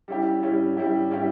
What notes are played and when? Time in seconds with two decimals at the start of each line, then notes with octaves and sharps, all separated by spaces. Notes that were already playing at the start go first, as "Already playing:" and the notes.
0.08 G3 C#4 E4 G4
0.43 G3 C#4 E4 G4
0.77 G3 C#4 E4 G4
1.11 G3 C#4 E4 G4